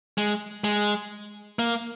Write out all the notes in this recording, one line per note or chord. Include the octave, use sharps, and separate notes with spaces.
G#3
G#3
A#3